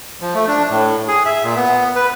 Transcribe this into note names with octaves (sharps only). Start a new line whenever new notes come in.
F3
A3
D4
A2
G#4
E5
A#2
B3
B4